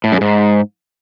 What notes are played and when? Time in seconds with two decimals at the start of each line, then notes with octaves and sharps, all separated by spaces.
0.04 A2
0.12 F#2
0.21 G#2